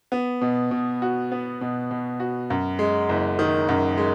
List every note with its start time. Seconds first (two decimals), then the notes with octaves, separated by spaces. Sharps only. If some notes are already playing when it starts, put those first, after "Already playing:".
0.12 B3
0.41 B2
0.71 B2
1.02 F#4
1.32 B3
1.61 B2
1.91 B2
2.20 F#4
2.50 F#2
2.79 G#3
3.09 F#1
3.39 D#3
3.69 F#2
3.97 G#3